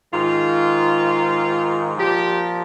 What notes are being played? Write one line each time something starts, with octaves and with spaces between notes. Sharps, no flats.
G#2 D#3 F4
A#2 F3 G4